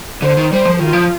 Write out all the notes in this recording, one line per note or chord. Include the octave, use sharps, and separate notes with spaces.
D3 C5
D#3
G3 C5
F3
D#3 F4
F3